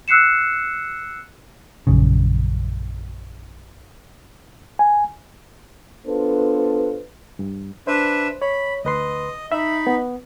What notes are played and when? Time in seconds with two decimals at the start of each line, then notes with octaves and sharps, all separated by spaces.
0.08 E6 F#6 C7 C#7 E7
1.87 A#1 F#2 C#3
4.79 G#5
6.07 B3 D4 F4 A4 B4 C5
7.39 G2
7.87 D4 B4 C5 E5
8.42 C#5 B5
8.85 D2 B4 D#5 C6
9.52 D#4 E5 B5
9.87 B3